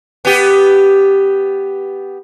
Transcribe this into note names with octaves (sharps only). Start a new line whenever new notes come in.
B3 G4